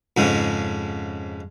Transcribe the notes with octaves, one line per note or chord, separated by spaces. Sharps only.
F2 G#2 C#3